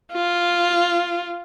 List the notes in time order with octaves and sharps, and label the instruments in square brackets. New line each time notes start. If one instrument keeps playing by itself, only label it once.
[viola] F4